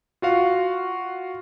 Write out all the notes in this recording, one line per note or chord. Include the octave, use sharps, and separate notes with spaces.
F4 F#4 F5